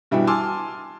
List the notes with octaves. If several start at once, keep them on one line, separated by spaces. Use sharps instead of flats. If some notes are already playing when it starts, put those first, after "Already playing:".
G2 B2 E3 G3 E4 F#4
G#5 A5 C6 D6 E6 F6